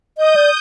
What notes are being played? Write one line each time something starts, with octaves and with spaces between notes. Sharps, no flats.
D#5 D#6 G6
D5